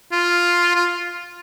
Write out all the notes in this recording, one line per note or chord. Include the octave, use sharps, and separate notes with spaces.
F4
F4